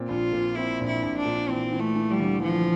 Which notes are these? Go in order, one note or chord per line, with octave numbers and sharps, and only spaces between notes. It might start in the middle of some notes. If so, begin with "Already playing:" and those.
Already playing: A#2 C4
A#1 F4
A#2
C4 E4
A#1
E4
A#1
D4
A#2
E3 C4
E3
A3
E3
G3
D2
E3 F3